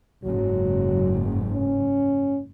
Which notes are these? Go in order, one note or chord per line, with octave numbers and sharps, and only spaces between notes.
F#1 G#2 F#3
C#4